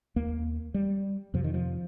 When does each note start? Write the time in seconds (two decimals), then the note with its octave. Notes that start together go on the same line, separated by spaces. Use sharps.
0.16 D#2 A#3
0.74 G3
1.34 F2 C3 F3
1.44 D#3
1.54 F3